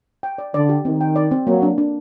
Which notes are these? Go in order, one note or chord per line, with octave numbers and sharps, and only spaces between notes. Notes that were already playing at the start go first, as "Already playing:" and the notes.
G5
D5
D3 D5
G4
D#3 C4
G5
D5
C4
F#3 A#3
D4
D4